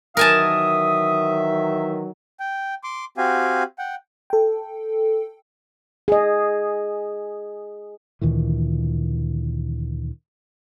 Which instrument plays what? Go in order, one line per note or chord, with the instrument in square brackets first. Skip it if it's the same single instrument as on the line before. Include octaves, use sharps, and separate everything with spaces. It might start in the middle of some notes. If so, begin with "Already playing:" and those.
[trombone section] D#3 E3 F#3 [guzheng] A#4 G#5 A5 [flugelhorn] E5 [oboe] D#6
[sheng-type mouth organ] G5
C6 D6
C4 F#4 G4 F5 G#5
F#5 G5
[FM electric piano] A4 G5
[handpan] G#4 D#5
[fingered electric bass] D2 A#2 D#3 E3